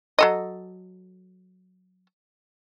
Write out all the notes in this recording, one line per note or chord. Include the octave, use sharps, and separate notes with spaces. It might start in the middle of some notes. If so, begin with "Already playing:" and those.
F#3 A4 D#5